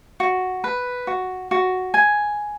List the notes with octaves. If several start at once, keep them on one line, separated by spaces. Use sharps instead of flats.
F#4
B4
F#4
F#4
G#5